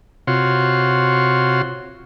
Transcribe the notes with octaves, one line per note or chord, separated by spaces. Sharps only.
C3 F4 F#4 C#5 C6